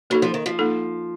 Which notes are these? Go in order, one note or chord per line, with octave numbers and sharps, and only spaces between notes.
F#3 A#3 D#4 A4
F3
D#3
F3
A#3 D#4 A4